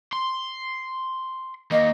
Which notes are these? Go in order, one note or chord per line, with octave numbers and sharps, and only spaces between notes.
C6
D#3 A#3 D#5